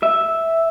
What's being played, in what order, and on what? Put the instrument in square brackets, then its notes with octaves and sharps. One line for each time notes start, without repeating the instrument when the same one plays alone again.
[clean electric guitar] E5